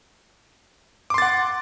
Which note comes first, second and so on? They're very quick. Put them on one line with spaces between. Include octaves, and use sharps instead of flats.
D6 C6 A6 F#5